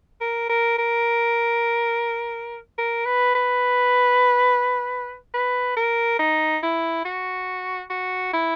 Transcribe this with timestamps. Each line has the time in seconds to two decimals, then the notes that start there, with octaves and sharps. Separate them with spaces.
0.21 A#4
0.49 A#4
0.78 A#4
2.78 A#4
3.06 B4
3.35 B4
5.34 B4
5.77 A#4
6.19 D#4
6.63 E4
7.05 F#4
7.90 F#4
8.33 E4